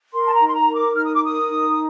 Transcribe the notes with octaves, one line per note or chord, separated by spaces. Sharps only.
A#4 C6
A5
A#5
D#4
C6
A#5
A#4
D6
D#4 F6
D#6
D6
A#4 D#6
D#4